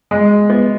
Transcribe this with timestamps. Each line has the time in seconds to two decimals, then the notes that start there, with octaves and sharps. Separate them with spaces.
0.11 G#3
0.50 B3